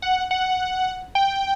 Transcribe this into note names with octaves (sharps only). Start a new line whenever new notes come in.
F#5
F#5
G5